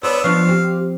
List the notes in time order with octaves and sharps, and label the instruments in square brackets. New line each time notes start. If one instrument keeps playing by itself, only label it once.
[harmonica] B3 D4 E6 [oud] C5 [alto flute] C#5
[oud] F3 B3 D4 [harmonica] F5 [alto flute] C#6
[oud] C4 [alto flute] G4